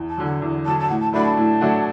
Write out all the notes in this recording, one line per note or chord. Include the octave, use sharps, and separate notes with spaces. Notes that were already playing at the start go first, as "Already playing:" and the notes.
Already playing: E2
A5
D3 F#3
F#5
E2
D3 F#3 A5
A5
A2 F#5
A5
F#3 A3 D4 F#4 B5
A5
A2
F#3 A3 D4 F#4